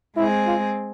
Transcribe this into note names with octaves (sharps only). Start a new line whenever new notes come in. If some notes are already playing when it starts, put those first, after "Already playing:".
G#3 C4 E4 G#4
F4